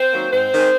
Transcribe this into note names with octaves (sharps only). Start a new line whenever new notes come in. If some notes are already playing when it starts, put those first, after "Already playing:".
Already playing: C4 C5
D#3 F#3 A#3
G#2 C4 C5
D#3 G#3